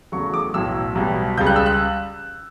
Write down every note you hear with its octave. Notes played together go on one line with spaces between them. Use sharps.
E2 C#3 F#3 A3 C#6
D6
B1 A2 F#3 E6
B1 B2 G3
C#2 C#3 G3 G6
F#6
E6
F#6